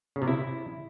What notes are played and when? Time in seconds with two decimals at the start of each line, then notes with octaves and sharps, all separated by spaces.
0.16 C#3
0.22 C3
0.28 E4